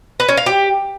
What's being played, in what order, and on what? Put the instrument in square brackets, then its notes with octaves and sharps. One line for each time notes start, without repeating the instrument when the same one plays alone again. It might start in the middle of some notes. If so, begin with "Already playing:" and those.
[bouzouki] B4
C#4
F5
G4